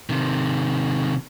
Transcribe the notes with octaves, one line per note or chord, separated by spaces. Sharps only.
C3 D#3